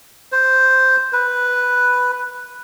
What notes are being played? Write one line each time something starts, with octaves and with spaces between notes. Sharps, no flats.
C5
B4